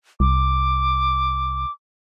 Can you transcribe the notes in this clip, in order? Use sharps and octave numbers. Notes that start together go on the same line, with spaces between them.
C2 D6